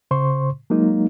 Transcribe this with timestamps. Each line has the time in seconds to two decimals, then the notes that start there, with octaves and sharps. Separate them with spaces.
0.11 C#3 C5 C6 C#6
0.70 F#3 G#3 A#3 D#4